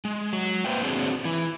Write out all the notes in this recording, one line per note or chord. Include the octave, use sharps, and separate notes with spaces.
G#3
F#3
A#3 B4 C5 E5 G5
C4 D4 F#4 G#4 C#5
E3 E4